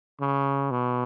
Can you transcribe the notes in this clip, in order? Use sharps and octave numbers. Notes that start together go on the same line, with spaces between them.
C#3
B2